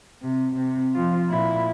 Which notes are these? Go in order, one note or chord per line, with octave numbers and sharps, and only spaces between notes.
C3
C3 C4
F3 F4
A#2 E4